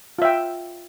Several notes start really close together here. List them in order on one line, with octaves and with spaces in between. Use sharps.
F4 E5 G5